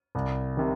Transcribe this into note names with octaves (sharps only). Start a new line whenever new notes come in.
C2
C3 D#3